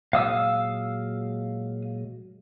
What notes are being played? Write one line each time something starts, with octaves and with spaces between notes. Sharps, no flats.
A#2 F#3 G#3 F5 D#6 E6